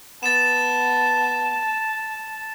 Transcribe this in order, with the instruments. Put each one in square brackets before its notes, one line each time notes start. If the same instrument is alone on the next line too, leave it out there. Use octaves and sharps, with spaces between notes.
[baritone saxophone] B3 [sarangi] A5 [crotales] A6 E7